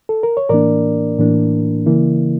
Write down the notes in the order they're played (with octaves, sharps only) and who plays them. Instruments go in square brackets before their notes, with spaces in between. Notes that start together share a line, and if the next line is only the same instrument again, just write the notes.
[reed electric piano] A4
A#4
C#5
A2 E3 A#3 D4 A#4 D5
A2 E3 A#3 D4
C#3 E3 A#3 E4